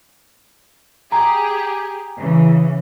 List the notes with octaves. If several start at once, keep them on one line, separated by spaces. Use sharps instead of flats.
G4 G#4 A#5
C#3 E3